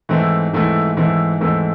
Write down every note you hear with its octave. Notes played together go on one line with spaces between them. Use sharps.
G#2 E3 A3 C4 E4
G#2 E3 A3 C4 E4
G#2 E3 A3 C4 E4
G#2 E3 A3 C4 E4